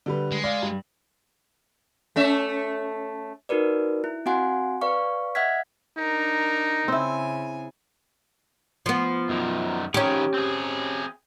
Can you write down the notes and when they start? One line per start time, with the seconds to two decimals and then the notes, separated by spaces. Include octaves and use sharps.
0.06 D3 G3 B4
0.32 G#3
0.44 D5 F5
0.62 G2
2.16 A3 C#4 E5
3.49 D#4 F#4 A#4 B4 D5
4.04 E4
4.26 C4 F#4 F5 F#5 G#5 C6
4.81 B4 D5 F5 C#6
5.35 D#5 E5 F#5 F6 G#6 B6
5.98 D4 D#4 A#4
6.88 C#3 C4 E4 G#5
8.86 F3 B3
9.29 F#2 D#3
9.94 D#3 F3 C#4 G4 G#4
10.34 C4 G#4